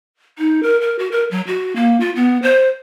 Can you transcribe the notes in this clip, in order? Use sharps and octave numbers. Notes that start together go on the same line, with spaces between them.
D#4
A#4
A#4
F#4
A#4
F#3
F#4
A#3
F4
B3
C5